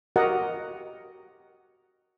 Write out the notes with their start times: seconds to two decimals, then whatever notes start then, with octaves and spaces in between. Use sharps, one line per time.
0.16 F#4 G4 A#4 D#5 F#5